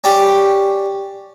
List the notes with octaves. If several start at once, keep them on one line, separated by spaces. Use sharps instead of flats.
C#4 D4 G4